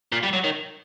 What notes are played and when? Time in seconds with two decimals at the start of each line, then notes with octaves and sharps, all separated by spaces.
0.12 A#2
0.23 G3
0.33 F#3
0.44 D#3